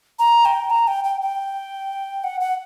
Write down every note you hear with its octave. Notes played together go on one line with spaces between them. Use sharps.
A#5
G5
A#5
G5
G5
G5
F#5
F#5